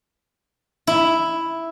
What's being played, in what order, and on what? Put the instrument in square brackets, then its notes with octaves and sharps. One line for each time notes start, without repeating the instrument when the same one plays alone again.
[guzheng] E4